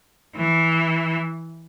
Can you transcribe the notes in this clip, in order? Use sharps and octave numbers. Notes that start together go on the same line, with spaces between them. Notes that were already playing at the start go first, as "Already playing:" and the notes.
E3